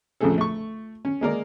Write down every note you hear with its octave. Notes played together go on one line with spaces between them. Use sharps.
A#1 F2 C#3 A3 G#4 A4
A3 C#6
C#4
G#3 A#3 A#4 D5